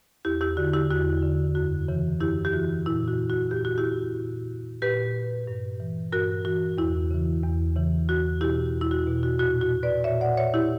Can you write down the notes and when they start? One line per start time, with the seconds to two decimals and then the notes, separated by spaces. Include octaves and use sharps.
0.25 E2 E4 G4
0.41 E4 G4
0.57 D3 F#4
0.73 E4 G4
0.90 E2 F#4
1.22 D3
1.55 F#2 F#4
1.88 C#3 E3
2.20 F#2 E4 G4
2.45 G4
2.53 C#3 E3 F#4
2.86 A#2 E4
3.08 F#4
3.30 F#4
3.51 A#2 G4
3.65 F#4
3.78 E4 G4
4.17 A#2
4.82 A#2 G4 B4
5.47 G2
5.80 E3
6.12 G2 F#4 A#4
6.45 E3 F#4
6.78 E2 E4
7.11 C#3 E3
7.43 E2
7.76 C#3 E3
8.08 E2 F#4
8.41 B2 E4 G4
8.74 E2
8.81 E4
8.91 F#4
9.07 B2
9.23 F#4
9.39 A#2 F#4
9.61 F#4
9.83 B4 D5
10.04 A#2 C#5 E5
10.21 D5 F#5
10.37 C#5 E5
10.54 E4 G4